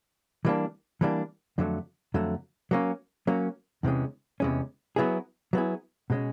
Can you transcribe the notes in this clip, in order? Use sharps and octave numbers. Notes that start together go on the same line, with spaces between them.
E3 G3 A#3 D4
E3 G3 A#3 D4
F2 D3 F#3 A3
F2 D3 F#3 A3
F#3 A#3 C#4
F#3 A#3 C#4
E2 C3 E3 G#3 C#4
E2 C3 E3 G#3 C#4
F#3 B3 E4 G#4
F#3 B3 E4 G#4
B2 G#3 C#4